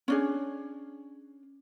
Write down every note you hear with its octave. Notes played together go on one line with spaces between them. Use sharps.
C#4 D4 G#4